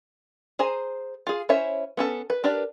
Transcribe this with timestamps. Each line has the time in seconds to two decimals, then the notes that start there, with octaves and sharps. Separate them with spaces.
0.59 G#4 C5 G#5 A#5
1.27 F4 G#4
1.49 C#4 E4 C5 C#5 E5
1.97 B3 C#4 A4
2.30 B4
2.44 D4 G4 A#4 B4 D5